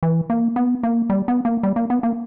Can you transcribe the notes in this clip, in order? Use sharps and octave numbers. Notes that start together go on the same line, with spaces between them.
E3
A#3
B3
A#3
G3
B3
A#3
G3
A#3
B3
A#3